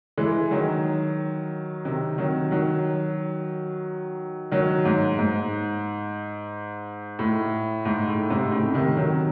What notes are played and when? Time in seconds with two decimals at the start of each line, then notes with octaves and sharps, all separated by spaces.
0.18 E3 G#3
0.51 D#3 F#3
1.85 C3 D#3
2.18 D#3 F#3
2.51 D#3 F#3
4.51 D#3 F#3
4.85 G#2
5.19 G#2
7.19 A2
7.85 G#2
8.08 A2
8.30 G#2 C3
8.52 A2 C#3
8.74 C3 D#3
8.97 D#3 F#3